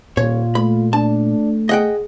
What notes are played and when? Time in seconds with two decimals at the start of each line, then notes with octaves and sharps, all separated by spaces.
0.17 D#1 A#2 F4 C#5
0.55 A3 B5
0.93 A3 D4 A5
1.69 G#4 D#5 F#5 G5